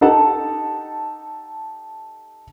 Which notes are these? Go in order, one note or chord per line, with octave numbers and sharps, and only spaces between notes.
D#4 G4 A4 F#5 A5